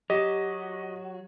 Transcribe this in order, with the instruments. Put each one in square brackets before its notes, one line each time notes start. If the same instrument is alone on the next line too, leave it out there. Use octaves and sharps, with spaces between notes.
[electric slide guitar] F#3 F#4 [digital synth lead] G4 [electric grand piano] D#5